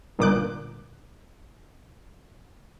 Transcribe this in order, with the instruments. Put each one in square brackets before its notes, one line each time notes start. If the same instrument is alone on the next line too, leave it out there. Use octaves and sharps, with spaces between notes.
[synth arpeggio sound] G1 A#2 D6 F#6